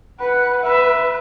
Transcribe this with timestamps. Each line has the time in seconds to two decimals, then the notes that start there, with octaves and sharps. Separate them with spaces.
0.19 B4 F#5
0.62 B4 E5